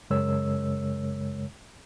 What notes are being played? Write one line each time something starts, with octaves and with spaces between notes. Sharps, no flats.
F#2 C#3 G#3 A#4 C#5 E6